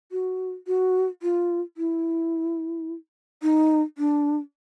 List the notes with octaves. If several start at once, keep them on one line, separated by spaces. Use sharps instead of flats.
F#4
F#4
F4
E4
D#4
D4